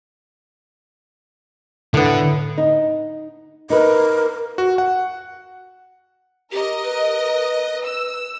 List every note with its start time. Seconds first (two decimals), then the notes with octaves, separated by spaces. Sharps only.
1.94 A2 D3 B3
2.58 D#4
3.70 D#4 A#4 B4
4.58 F#4
4.78 F#5
6.52 G4 A#4 D#5
6.84 B4
7.84 E6